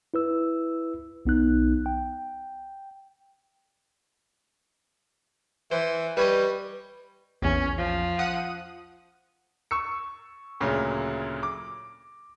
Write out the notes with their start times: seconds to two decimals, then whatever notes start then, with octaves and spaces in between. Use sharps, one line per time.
0.14 E4 B4 E6
1.25 B1 B3 D#4 F#6
1.86 G5
5.71 E3 C5
6.17 G3 B4 C#5 D#5
7.42 A#1 E2 C#4
7.78 F3
8.19 F#5 D#6 D#7
9.71 C#6 E6 C#7
10.60 D2 A#2 C#3 F#3
11.43 D6